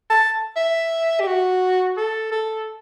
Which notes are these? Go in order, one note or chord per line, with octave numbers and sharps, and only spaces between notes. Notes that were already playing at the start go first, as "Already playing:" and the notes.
A5
E5
G4
F#4
A4
A4